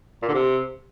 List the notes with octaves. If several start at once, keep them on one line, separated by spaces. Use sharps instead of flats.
A#2
D3
C3